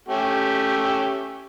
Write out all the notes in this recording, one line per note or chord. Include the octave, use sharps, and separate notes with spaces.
A3 C#4 G4